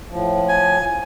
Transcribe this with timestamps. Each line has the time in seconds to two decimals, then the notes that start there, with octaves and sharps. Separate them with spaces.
0.09 A2 F3
0.49 G#5